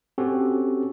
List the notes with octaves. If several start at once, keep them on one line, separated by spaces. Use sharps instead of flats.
C4 C#4 F#4 G4 A4